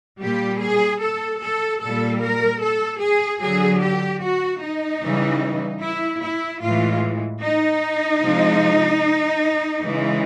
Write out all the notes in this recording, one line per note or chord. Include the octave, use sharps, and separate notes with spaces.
A#2 G3 G4
G#4
A4
A4
A#2 G3 A4
A#4
A4
G#4
D3 F#3 G#4
G4
F#4
D#4
C#3 E3 G3
E4
E4
A2 E3 G#3 F4
D#4
C3 F3 G#3
C#3 E3 G#3